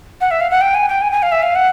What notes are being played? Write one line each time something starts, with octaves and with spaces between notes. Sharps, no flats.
F#5
E5
F5
F#5
G5
G#5
G5
G#5
G#5
F5
E5
F5
F#5